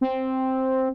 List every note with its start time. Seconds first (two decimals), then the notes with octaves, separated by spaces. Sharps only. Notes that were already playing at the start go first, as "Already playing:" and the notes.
0.01 C4